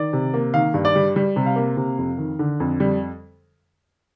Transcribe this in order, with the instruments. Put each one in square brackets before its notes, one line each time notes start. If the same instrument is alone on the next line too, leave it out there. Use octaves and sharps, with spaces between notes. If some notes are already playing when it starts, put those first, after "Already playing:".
Already playing: [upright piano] D#3 D5
C3
A#3
D#3 F5
G2
D5
G3
G3
C3
F5
A#3
C3
F2
D#3
D3
F2
G3